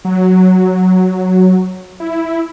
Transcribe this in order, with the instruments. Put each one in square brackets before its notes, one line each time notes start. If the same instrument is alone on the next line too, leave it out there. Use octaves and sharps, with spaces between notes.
[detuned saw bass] F#3
E4